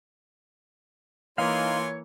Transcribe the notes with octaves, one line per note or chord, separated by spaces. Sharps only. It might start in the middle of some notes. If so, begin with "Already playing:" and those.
E3 A#3 D#4 F4 C#5 F5 G#5 C6